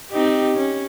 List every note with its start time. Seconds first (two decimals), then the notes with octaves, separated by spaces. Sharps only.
0.11 C4 D#4 G4
0.56 C#4